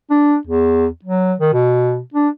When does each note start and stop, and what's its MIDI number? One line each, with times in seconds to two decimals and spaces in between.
0.10 0.35 62
0.47 0.86 40
1.05 1.33 54
1.40 1.53 51
1.53 1.99 47
2.14 2.28 62